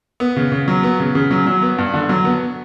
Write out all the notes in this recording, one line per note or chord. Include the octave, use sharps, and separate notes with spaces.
B3
C#3
C#3
F#3
B3
C#3
C#3
F#3
F#3
B3
G2
D3
F#3
B3